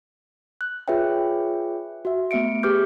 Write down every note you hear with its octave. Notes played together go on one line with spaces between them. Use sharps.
F#6
F4 G#4 B4 C#5 E5 G5
F#4 E5
A3 B3 E5 C#7 D7
G4 G#4 B4 D6 F6 G6